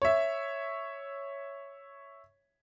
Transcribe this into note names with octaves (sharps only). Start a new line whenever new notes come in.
C#5 E5